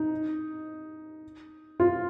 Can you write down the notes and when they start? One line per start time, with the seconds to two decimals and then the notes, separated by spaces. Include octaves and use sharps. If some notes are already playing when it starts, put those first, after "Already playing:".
Already playing: D#4
1.80 F4